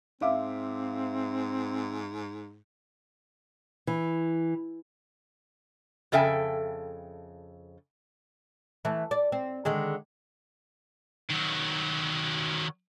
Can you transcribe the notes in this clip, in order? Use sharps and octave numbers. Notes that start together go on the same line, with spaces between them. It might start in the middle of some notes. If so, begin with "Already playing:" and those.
G#2 C4 E5 F5 D6
E3
F2 C#3 A4 E5 G5 G#5
E3 A3
D5
C4
D3 D#3 G#3
D#3 F#3